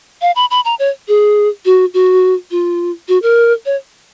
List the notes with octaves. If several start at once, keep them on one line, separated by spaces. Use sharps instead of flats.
F5
B5
B5
A#5
C#5
G#4
F#4
F#4
F4
F#4
A#4
C#5